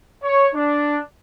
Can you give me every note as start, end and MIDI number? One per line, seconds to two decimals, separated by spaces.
0.23 0.47 73
0.55 0.98 62